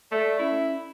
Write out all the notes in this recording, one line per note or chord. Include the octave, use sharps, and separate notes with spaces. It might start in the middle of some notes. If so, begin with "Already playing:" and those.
A3 D5
C#4 E4